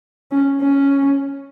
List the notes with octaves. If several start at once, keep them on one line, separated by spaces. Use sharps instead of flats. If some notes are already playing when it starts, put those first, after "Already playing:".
C#4
C#4